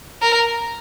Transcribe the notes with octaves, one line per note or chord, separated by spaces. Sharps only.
A#4